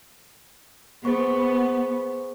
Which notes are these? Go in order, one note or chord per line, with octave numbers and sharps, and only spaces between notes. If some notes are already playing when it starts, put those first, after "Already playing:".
B3 G#4 C5 C#6